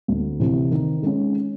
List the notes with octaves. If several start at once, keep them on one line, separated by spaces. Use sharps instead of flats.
D2
C3 E3
D#3
G#3 C#4